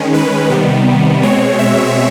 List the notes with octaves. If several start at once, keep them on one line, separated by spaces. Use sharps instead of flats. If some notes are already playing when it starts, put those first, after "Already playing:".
Already playing: D#3 G#3 C#4
B4
C3 D#3 G3 B3
B2 G#3 C4 C#5
E5